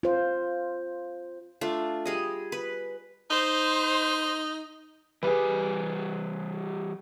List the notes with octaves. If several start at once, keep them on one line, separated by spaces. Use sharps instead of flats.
F4 C5
A3 D4 F4
G3 G#4 D#5
B4
D#4 C5
E3 G3 G4 G#4 B4